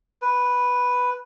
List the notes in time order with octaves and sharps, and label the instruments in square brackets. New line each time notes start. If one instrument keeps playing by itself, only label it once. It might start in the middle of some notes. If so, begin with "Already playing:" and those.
[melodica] B4